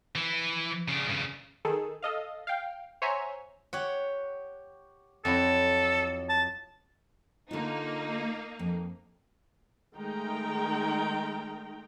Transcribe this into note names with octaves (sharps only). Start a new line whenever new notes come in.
E3
C#3 D4
G2 C#3
D#3 G#4 A4
A4 D#5 F5
F5 G5
C5 C#5 E5 F#5 G#5 A#5
G4 C#5 F#5
F2 F#3 E4 A4
A5
D3 A#3 D#4 F4
F2
D#3 G#3 A3 D#4 G5 A#5